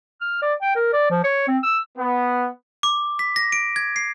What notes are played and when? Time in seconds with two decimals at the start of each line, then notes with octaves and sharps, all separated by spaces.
0.21 F6
0.42 D5
0.62 G5
0.76 A#4
0.93 D5
1.10 F3
1.24 C#5
1.48 C4
1.63 E6
1.98 B3
2.83 D6
3.19 B6
3.36 A#6
3.52 D7
3.76 G#6
3.96 C7